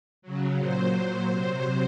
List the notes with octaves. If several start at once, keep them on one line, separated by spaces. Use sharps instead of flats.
C#3 F#3
A#2 F#3 C5
A#2 F#3
C3 F#3